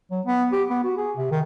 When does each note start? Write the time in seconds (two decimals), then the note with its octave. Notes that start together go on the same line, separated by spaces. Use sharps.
0.11 F#3
0.26 B3
0.52 G4
0.70 B3
0.84 F#4
0.98 G#4
1.17 C3
1.32 D#3